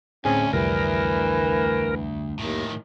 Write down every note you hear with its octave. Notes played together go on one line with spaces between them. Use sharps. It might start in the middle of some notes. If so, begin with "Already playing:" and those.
D2 A2 C4 C#4 G#4
C2 F2 E3 G3 A#4
D#2 A2 D#3